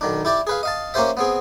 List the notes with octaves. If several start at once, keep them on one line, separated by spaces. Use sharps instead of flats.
B1 D#3 D4
E4 G4 D5
G#4 B4 F5
D#5 F5 A5
A#3 C#4 G4 C5 E5
B3 C4 G#4